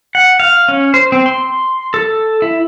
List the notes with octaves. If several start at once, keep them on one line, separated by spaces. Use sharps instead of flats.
F#5
F5
C#4
C5
C4
C6
A4
E4